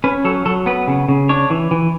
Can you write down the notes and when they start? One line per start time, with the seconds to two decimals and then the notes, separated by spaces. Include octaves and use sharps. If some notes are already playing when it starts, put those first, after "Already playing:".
0.04 C#4 B4
0.25 F#3 A4
0.46 F#3 A4
0.66 B3 B4
0.88 C#3
1.09 C#3
1.29 D4 C#5
1.50 E3
1.71 E3